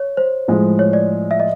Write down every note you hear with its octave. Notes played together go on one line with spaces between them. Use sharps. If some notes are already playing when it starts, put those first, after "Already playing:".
Already playing: C#5
C5
A2 F3 G#3
C#5
D5
E5
D#5